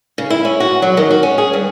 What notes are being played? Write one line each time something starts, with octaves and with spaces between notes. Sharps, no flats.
C#3
E4
C#4
F#4
F#3
D#3
F#4
C#4
G#4
G2